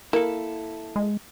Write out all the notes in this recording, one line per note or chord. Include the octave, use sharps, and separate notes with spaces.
A#3 E4 A4
G#3